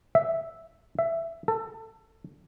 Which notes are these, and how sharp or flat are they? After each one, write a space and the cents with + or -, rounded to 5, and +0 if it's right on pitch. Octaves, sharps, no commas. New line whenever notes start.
E5 -5
E5 +10
A4 +20